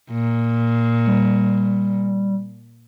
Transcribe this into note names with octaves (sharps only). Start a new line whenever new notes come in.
A#2
G3